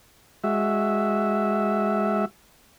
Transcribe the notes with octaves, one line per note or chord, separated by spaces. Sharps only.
G#3 F#4 E5